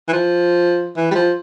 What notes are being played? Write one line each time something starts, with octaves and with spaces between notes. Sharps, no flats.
E3
F3
E3
G3
F3